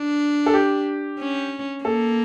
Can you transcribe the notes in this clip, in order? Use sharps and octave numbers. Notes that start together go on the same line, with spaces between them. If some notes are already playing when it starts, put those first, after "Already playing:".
Already playing: D4
A4
G4
C#4
A#3 A4